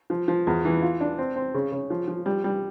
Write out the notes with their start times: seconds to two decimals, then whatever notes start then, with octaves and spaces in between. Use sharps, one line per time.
0.10 F3
0.28 F3
0.47 E2
0.65 E3
0.82 F4
1.01 D4
1.18 C4
1.36 C4
1.54 C#3
1.72 C#3
1.90 F3
2.08 F3
2.26 G3
2.44 G3